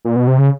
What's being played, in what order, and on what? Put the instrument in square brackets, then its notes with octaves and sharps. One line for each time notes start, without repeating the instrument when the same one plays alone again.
[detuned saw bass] A#2
B2
C3
C#3